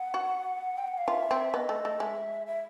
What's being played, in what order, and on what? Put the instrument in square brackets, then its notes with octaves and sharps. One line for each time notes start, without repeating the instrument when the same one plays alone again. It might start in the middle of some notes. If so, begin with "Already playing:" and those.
Already playing: [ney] F#5
[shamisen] F#4
[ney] G5
F#5
F5
[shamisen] F4 [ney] E5
[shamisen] C4
[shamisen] B3 [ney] D#5
[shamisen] A3
A3
[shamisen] G#3 [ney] E5
[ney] E5